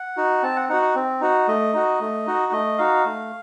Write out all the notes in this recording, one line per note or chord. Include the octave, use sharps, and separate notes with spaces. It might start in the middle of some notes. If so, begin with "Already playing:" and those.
Already playing: F#5
D#4 F#4
C4 A5
F#5
D#4 F#4 F#5
F#5
C4
D#4 F#4
A3 D#5
D#4 F#4
A3
D#4 F#4
A3 D#5
D#4 F#4 F5
A3